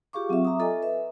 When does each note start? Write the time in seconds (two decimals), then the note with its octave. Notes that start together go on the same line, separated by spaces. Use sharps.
0.13 F4 G4 G#4 F5 C#6 D6
0.29 F#3 C4 F4 E5
0.45 E5 A#5 D6 D#6
0.59 F4 A4 D#5 E5 G#5
0.82 B4 E5